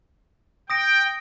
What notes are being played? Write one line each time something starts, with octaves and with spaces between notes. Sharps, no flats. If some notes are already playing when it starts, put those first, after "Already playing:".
G5 D#6 A#6 D7